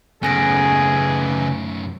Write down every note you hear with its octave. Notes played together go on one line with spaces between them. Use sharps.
F#2 C#3 A3 B3 G#4 G#5 A#6 D7